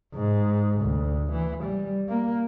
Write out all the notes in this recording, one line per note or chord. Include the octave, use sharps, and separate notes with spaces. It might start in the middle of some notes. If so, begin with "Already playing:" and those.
G#2
D2
E3
G3
A#3